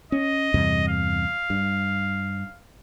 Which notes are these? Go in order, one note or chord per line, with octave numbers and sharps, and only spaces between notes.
C#4 D#5
E2 G2 C3
F5
G2